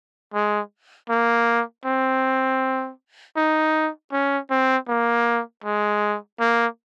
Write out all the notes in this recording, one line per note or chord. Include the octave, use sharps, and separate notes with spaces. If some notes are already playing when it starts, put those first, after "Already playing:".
G#3
A#3
C4
D#4
C#4
C4
A#3
G#3
A#3